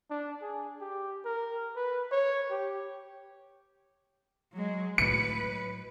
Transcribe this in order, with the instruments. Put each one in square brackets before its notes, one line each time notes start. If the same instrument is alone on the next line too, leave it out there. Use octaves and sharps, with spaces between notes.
[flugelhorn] D4
G#4
G4
A#4
B4
C#5
G4
[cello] F#3 G#3
[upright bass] A2 F#3 [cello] B4 [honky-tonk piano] C#7